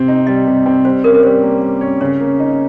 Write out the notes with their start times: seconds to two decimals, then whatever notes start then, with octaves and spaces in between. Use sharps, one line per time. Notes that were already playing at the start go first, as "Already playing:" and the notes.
Already playing: C3 C4
0.08 D#4
0.27 G3 D#5
0.47 C3
0.66 C4
0.85 G3 C5
1.04 C#4 A#4
1.14 A#4
1.23 G3 C5
1.43 A#3
1.62 G3
1.81 C#4
2.01 C#3 C#5
2.20 A#3
2.40 D#4